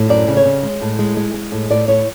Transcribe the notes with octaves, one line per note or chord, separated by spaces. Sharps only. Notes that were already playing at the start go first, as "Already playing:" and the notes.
Already playing: A2
F#2 D5
C#3
C#5
C#3
G#3
A2
G#3
G#3
G#3
A2
A2 D5
A2 C#5